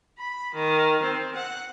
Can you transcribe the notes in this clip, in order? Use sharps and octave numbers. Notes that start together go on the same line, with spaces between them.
B5
D#3
C4
F#5